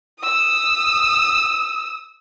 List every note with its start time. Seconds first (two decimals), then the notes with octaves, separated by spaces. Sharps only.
0.21 D#6 E6